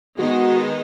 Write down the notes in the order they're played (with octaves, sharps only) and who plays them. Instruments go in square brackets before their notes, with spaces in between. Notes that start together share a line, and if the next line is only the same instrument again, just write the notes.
[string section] D#3 G#3 B3 D#4 [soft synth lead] F#4